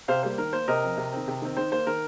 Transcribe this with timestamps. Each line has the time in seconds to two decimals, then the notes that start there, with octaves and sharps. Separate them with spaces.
0.08 C3 C5 F5
0.23 G3 A#3 C5
0.38 D#3 A#4
0.53 A#3 C5
0.68 C3 A#4 D#5
0.83 F3 C4
0.98 C3
1.13 D#3 C4
1.28 C3
1.42 D#3 C4
1.57 D#3 C5
1.72 A#3 C5
1.87 D#3 A#4